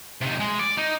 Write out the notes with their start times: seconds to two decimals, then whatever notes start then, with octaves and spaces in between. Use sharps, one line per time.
0.21 C3 D#4
0.40 G#3
0.59 D5
0.78 D#4